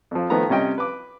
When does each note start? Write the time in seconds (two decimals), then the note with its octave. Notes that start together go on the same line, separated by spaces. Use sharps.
0.11 F2 F3
0.30 D#3 F3 A3 B3 A4 A#5
0.49 C3 G3 C#4 D#5 G5
0.78 B4 D6